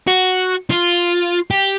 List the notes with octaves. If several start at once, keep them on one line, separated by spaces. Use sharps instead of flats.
F#4
F4
G4